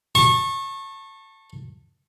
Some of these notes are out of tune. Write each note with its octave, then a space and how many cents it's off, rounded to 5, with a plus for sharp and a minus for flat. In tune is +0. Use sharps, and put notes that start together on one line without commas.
A5 +20 C#6 -25